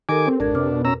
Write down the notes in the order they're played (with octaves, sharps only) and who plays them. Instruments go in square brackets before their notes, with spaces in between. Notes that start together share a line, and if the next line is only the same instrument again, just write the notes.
[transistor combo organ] D#3 G#5 D6 [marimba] G4 A4 A#4
[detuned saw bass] C4
[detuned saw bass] G#1 [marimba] F2 A#4 G#6 [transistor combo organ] D4
[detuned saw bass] C3 [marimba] B4 D6 F6
[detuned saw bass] B2
[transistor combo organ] C#4 A#5 E6